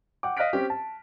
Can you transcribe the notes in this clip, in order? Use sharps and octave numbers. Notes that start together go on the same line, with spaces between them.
F#5 G5 D6
D#5 F5 F6 F#6 B6 D7
C4 C#4 G4
A5